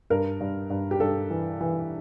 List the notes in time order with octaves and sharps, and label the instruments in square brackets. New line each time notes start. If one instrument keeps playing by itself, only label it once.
[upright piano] G2 A#4
G2
G2
G4
G2 A4
E3
E3